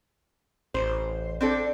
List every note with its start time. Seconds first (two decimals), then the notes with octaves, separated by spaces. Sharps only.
0.74 A1 C5
1.41 C4 D4 A4